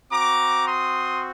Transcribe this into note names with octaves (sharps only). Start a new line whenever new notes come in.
C4 F#4 A#5 D6
C6 D#6